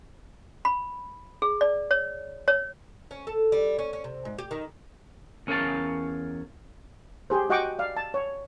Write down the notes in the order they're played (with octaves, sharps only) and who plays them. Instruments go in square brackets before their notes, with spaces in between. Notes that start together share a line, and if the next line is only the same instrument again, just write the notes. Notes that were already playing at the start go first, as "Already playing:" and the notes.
[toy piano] B5
G#4
D5
C#5
C#5
[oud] C#4
A4
G3
C#4
C#4
C3
G#2
G4
D#3
[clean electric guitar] E2 C#4 A#4 C#5 F5 A5
[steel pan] G4 G#4 C5
F#4 D#5 F#5 G5 C#6 D6
D5 F5
A5
C#5